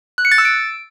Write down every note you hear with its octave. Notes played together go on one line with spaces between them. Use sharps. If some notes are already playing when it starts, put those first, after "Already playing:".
F#6
C#7
A6
E6
D7